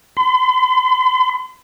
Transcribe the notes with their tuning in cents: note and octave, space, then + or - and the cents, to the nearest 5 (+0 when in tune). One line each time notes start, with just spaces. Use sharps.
C6 -45